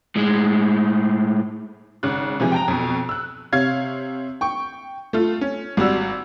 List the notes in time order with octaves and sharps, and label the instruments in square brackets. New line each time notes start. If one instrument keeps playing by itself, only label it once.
[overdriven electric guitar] A2 G#3
[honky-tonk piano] G#1 C#3 F#6
C3 E3 F3 G#3
G5 A5 A#5
F2 B2
E6 F#6
C3 C#5 F5 G#6
G5 C#6
A3 F4
C#4
G#1 G3 F#4 E6